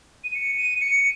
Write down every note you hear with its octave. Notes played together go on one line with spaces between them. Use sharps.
D#7
C#7
D#7
C#7